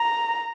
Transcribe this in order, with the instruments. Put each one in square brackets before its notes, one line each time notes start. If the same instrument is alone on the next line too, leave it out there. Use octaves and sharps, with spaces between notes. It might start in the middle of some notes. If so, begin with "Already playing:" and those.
Already playing: [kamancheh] A#5